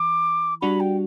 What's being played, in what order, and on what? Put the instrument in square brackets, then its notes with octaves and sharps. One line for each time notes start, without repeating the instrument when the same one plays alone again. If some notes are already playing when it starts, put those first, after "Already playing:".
Already playing: [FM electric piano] E3 [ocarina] D6
[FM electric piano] G3 D4 F#4 [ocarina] B5
[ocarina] G5